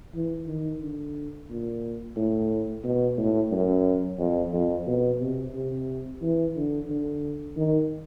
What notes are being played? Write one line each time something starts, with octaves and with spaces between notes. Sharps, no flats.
E3
D#3
D3
A#2
A2
B2
A2
F#2
F2
F2
B2
C3
C3
E3
D3
D3
D#3